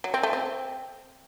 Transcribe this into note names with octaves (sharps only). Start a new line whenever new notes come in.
F#3
C4
A3
C4